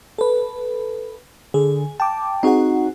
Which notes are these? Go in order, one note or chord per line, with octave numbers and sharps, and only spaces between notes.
A4 B4
D3 G#4
G5 A5 D6
C4 D#4 F#4 G#4 F#5